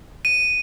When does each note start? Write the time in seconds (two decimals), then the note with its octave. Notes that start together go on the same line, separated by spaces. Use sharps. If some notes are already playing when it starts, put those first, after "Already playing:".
0.25 D#7